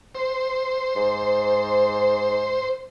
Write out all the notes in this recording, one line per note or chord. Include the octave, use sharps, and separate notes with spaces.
C5
G#2